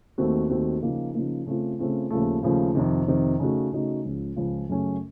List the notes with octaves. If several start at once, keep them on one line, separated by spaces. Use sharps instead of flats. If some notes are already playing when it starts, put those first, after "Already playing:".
D#2 D#3 A3 C4 F#4
D#2 D#3 A3 C4 F#4
C#3 F3 A#3 D#4
C#3 F3 A#3 D#4
C#3 A3 C4 F4
C#3 A3 C4 F4
D#2 C#3 F3 A3
D#2 C#3 F3 A3
F2 C3 D#3
F2 C3 D#3
C#3 A3 D#4 F#4
C#3 A3 D#4 F#4
C#2 C#3 F3
C#2 C#3 F3
F#2 C#3 A3 C#4